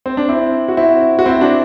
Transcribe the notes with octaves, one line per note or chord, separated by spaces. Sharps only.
C4
D4
C4 E4
F#4
C4 E4
F#4
C4 E4
D4 F#4